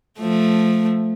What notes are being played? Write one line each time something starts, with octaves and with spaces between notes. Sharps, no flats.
F3 A3